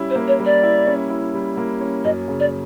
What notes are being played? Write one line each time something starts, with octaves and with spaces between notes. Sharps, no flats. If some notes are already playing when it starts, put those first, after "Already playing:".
Already playing: G3 C#4 E4
C5
A#3
C#5
G3
D5
E4
C#4
E4
G3
A#3
C#4
F#2 D#5
C#3
D5